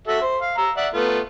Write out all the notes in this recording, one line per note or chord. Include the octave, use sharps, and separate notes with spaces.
F#4 A4 E5
C5
F5
A#5 E6
D5 E5 F#5
A3 B3 F4